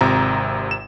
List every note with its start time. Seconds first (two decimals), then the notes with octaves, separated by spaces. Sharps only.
0.01 G#1 C3 F4 A#5
0.71 E7